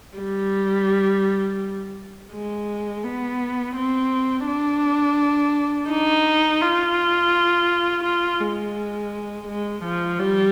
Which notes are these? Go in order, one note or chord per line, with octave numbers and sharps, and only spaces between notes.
G3
G#3
B3
C4
D4
D#4
F4
F4
G#3
G#3
F3
G3